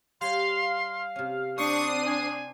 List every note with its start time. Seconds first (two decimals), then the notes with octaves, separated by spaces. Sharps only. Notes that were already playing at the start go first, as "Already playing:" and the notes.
0.21 G3 C#5 F5 C6
1.16 C3 C#4
1.58 C4 D4 C5 C#6 D#6 C7 D#7
2.06 G#5